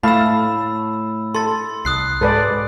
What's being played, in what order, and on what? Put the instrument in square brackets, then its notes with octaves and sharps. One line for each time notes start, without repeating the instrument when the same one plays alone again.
[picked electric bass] A2 [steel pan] A3 F5 A5 [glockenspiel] B5 E6
[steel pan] A4 [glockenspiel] C6 A6
[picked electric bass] C2 [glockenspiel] D#6 F#6 C7
[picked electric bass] G#2 G#3 [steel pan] A4 B4 D5